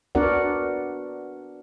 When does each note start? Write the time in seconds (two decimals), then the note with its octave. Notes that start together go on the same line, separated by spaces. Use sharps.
0.15 B3 D4 F#4 A#4 D5 F#5